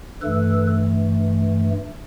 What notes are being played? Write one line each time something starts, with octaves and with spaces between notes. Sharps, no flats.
G2 E3 A3 A4 B4